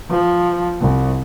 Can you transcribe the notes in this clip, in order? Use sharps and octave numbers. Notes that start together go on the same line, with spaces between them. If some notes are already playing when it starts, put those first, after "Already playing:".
F3
C2